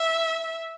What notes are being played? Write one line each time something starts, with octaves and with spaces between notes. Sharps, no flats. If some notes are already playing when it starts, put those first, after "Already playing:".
Already playing: E5